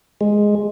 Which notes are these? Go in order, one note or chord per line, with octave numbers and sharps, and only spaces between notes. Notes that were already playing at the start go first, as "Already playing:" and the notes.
G#3